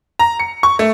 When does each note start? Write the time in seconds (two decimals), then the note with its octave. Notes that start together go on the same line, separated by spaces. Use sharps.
0.19 A#5
0.39 C#7
0.63 C#6
0.79 A3